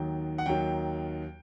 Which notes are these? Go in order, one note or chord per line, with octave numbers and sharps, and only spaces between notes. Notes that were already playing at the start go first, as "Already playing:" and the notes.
Already playing: D#2 D#3 F#3 G5
F#5
D#2 D#3 F#3 G5